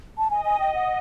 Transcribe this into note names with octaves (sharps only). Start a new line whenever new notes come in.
A5
D#5 G#5
G#5
G5
F#5